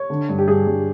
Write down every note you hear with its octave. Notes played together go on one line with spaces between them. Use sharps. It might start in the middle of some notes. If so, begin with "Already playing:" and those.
Already playing: C#5
D3
G2
G4
G2 G#4
G2